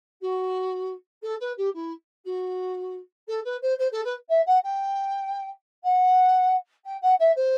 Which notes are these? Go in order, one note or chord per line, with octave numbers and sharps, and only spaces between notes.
F#4
A4
B4
G4
E4
F#4
A4
B4
C5
C5
A4
B4
E5
F#5
G5
F#5
G5
F#5
E5
C5